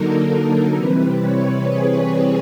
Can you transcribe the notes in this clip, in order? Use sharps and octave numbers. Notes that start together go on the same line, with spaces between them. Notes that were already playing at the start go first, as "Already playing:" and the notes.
Already playing: D3 F#3 A#3 D#4 A4 A#4
C3 E3 G3 C4 B4
C#5
G#4